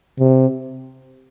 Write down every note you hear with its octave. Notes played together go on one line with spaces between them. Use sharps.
C3